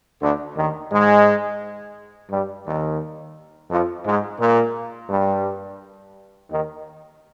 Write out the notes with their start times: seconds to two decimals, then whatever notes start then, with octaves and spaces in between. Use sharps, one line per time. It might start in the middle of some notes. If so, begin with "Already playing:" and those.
0.22 D2 D3
0.56 D#2 D#3
0.91 G#2 G#3
2.31 G2 G3
2.67 D#2 D#3
3.71 F2 F3
4.05 G#2 G#3
4.40 A#2 A#3
5.10 G2 G3
6.50 D#2 D#3